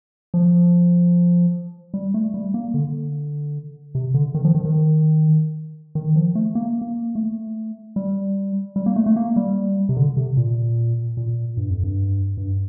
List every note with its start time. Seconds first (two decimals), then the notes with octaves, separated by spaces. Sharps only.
0.34 F3
1.94 G3
2.14 A3
2.34 G3
2.54 A#3
2.74 D3
3.95 C3
4.14 D3
4.34 D#3
4.45 F3
4.55 D#3
4.65 D#3
5.95 D#3
6.16 F3
6.35 A3
6.55 A#3
6.81 A#3
7.15 A3
7.96 G3
8.76 G3
8.86 A#3
8.96 A3
9.06 A3
9.16 A#3
9.36 G3
9.89 C3
9.97 D3
10.17 C3
10.37 A#2
11.17 A#2
11.57 G2
11.70 F2
11.83 G2
12.37 G2